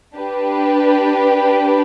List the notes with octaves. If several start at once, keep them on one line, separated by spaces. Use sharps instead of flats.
D4 G4 B4